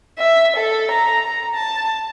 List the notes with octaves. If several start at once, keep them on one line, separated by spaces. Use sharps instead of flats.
E5
A4
A#5
A#5
A5